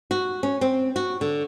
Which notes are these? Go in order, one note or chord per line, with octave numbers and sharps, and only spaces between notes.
F#4
C#4
C4
F#4
D3